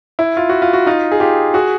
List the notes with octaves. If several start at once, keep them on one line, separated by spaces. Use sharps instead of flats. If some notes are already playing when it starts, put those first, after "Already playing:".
E4
F4
F#4
F4
F#4
D#4 F4
G#4
F4 G4
F#4 G#4